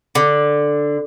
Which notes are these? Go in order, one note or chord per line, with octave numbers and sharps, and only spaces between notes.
D3